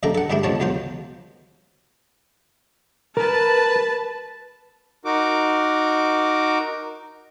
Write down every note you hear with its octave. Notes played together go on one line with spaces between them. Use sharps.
F#2 D3 D#3 A#3 A4 A#5
A4 F#5
G2 G3 G#3 D4 E4
C#2 B2 F3 C#5 A5
E2 F#3 F4 C5
A#4 B4 A5
D#4 F#4 A#4 D6